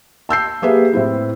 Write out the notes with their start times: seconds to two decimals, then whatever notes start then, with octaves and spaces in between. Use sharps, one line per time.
0.29 A5 E6 G6 C7
0.62 A#3 G4 G#4 B4 E5
0.93 A2 C4 E4